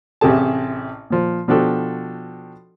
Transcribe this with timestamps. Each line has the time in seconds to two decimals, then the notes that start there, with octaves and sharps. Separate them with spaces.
0.21 A1 C3 G4 G#4 A5
1.10 A#2 F3
1.48 B2 F3 D4 F#4 G4 A4